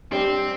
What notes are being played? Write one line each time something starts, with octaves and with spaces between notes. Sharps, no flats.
G3 C4 D4 G4